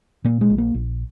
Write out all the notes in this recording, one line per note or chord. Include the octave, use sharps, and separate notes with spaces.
A#2 A#3
G#3
A#1
A#3
A#1